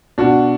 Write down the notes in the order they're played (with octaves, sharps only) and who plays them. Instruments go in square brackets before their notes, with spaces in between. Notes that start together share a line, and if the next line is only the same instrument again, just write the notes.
[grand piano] B2 D4 F#4